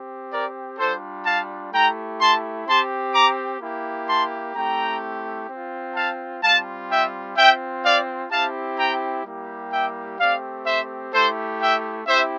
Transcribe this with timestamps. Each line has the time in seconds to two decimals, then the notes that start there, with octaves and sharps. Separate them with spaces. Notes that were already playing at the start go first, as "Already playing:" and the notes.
Already playing: C4 G4
0.31 A#4 D5
0.78 G3 D4 F4 A4 C5
1.25 F5 A5
1.72 A3 E4 G4 G5 A#5
2.20 A5 C6
2.66 C4 G4 A5 C6
3.14 A#5 D6
3.60 A#3 E4 G4
4.08 A5 C6
4.54 A3 C4 E4 G4 G5 A#5
5.49 C4 F4
5.95 F5 A5
6.42 G3 C4 F4 F5 A5
6.89 E5 G5
7.37 C4 F4 E5 G5
7.83 D5 F5
8.30 C4 E4 G4 F5 A5
8.78 G5 A#5
9.25 G3 A#3 E4 G4
9.72 E5 G5
10.19 A3 C4 G4 D5 F5
10.66 C5 E5
11.13 A3 E4 G4 A4 C5
11.60 E5 G5
12.07 C4 E4 G4 C5 E5